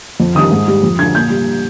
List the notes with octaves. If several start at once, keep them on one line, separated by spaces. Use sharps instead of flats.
F2
D#3 G3 D#6
G#2
G3
F2
D3 F3 G#6
A#2 G6
G3